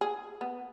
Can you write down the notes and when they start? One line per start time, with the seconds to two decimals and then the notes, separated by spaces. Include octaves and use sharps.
0.01 G#4
0.41 B3